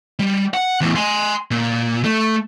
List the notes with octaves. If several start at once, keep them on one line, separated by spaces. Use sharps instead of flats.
G3
F#5
E2 A2
G#5 C6
A#2
A3